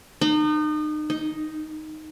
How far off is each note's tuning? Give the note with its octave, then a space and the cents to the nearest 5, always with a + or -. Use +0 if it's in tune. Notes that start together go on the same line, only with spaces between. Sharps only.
D#4 -35
D#4 +0